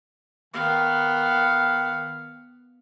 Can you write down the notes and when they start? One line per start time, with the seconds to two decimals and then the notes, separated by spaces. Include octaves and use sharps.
0.54 D#3 B3 F5